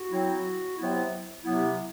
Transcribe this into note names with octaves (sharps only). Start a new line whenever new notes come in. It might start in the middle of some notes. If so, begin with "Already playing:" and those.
Already playing: F#4
F#3 C4 E4
C3 F#3 B3 E4
C3 F#3 B3 E4